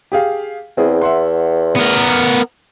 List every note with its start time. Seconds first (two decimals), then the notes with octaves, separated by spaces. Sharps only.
0.12 G4 G#4 F5
0.77 E2 C4 E4 G#4
1.02 E5 F#5 C6
1.75 B3 A#4